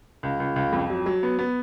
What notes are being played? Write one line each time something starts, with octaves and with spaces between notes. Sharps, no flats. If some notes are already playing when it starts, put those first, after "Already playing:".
C#2
C#2
C#2
F2
F#3
F#3
B3
B3